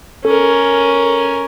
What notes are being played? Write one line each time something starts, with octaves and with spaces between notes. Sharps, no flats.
C#4 A4 A#4